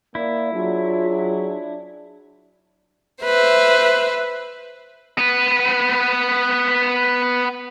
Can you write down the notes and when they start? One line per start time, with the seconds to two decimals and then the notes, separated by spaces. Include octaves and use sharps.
0.15 A#3 E4 D5
0.53 F#3 D4 F4 G#4
3.24 B4 C5 E5
5.18 B3 B4